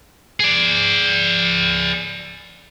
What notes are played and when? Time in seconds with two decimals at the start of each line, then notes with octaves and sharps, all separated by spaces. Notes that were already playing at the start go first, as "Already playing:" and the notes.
0.40 G#4 D5